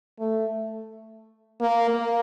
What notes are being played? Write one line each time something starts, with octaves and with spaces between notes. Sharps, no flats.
A3
A#3
A#3